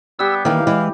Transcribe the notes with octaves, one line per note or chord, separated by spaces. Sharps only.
G3 B3 G4 E6
D#3 E3 A#3 F5
E3 G#3